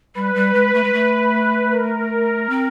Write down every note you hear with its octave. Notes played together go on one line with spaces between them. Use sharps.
G3 B4
G3
G#3
A3
G#3
A3
A#4
C4